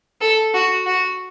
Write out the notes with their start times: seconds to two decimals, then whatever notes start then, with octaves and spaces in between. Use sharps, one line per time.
0.21 A4
0.54 F#4
0.86 F#4